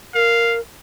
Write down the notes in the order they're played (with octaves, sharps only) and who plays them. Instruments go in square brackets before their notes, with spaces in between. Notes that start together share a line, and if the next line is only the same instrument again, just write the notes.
[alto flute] A#4 [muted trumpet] F5